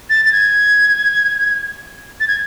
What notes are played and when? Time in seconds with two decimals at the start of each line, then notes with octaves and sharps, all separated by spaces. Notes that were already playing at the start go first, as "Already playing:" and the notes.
0.10 A6
0.25 A6
0.32 G#6
2.20 A6
2.28 G#6